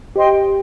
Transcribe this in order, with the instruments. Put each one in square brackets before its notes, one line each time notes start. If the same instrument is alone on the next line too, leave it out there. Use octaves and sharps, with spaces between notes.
[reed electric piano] G4 [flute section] C5 D#5 G5 C6